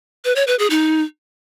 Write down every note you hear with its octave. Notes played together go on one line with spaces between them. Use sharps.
B4
C#5
B4
G#4
D#4